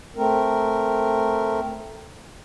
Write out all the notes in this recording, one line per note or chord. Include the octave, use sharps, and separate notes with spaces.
A3 C4 A#4